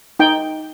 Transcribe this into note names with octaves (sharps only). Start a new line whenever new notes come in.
D#4 G5